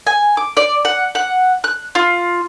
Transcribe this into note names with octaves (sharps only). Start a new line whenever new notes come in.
G#5
D6
D5
F#5
F#5
F#6
F4